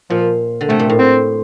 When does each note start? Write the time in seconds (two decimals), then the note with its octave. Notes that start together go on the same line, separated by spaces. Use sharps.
0.10 A#2 F3
0.61 D3
0.69 C3 A3
0.79 A#2
0.90 A2
0.99 C4